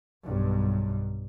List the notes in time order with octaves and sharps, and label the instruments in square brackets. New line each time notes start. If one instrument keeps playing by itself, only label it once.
[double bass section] B1 G2